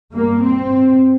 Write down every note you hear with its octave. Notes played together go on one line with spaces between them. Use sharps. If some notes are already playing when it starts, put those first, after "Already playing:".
G2 A#3
C4